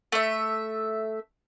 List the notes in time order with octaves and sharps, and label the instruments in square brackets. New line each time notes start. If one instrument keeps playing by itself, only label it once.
[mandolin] A3 E5